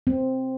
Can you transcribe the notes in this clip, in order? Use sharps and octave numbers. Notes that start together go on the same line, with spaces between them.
C4